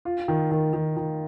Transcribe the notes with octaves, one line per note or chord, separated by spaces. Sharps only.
F4
D#3
D#3
D#3
D#3